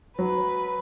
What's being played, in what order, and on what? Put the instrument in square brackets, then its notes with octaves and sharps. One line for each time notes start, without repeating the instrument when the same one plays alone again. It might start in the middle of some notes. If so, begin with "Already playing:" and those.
[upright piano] F#3 [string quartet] B4